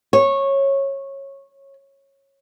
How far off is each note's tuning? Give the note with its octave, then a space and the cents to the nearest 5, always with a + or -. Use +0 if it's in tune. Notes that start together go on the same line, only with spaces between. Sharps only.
C#5 -15